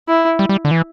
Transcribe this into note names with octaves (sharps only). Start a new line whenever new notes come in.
E4
G3
G3
D3
E3